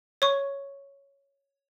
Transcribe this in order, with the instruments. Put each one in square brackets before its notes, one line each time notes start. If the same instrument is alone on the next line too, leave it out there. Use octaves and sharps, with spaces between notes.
[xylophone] C#5 C#6